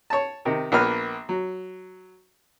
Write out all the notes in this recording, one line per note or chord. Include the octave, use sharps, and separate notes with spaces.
C#5 A5
C3 D#3
A#1 A#3 B3 B4 F6
F#3